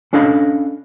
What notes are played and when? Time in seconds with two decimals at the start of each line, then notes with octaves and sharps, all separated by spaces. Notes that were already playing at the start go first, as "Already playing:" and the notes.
0.13 C#4 D4 A4 D#5 F5 B5